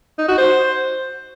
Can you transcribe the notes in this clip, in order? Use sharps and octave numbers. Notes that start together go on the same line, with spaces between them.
D#4
F#4
C5